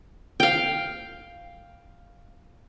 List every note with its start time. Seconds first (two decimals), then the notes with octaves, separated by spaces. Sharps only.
0.40 F5 G5